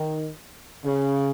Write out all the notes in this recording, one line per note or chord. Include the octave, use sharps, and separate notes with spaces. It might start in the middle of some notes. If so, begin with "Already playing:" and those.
Already playing: D#3
C#3